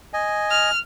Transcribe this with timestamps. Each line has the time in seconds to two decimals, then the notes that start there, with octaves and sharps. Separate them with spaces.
0.13 D#5 G#5
0.51 F6